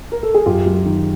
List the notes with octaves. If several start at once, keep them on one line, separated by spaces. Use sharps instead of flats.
A#4
A4
G#4
F#2 F4 G4
F#3
D#3